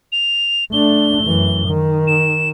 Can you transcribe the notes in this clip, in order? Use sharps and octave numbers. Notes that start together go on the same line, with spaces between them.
F7
A3 D4 G7
F#2 E3
D#3
E7